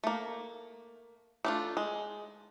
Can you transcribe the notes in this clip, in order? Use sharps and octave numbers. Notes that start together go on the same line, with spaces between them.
A3 A#3
A3 D4 F4
G#3